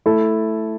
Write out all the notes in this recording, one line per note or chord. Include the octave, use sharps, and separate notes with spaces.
A3 E4 A4